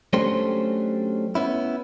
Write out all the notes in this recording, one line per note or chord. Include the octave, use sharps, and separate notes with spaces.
F#3 A3 C#4 D4 G4 C5
B3 C#4 E4